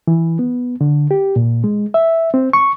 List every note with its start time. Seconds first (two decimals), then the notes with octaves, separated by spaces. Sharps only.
0.08 E3
0.39 B3
0.81 D3
1.11 G4
1.36 A#2
1.64 G#3
1.94 E5
2.34 C4
2.53 C#6